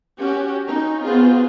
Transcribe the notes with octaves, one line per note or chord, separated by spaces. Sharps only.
C#4 F#4 G4
C#4 D#4
B3 C4 F4 F#4 G#4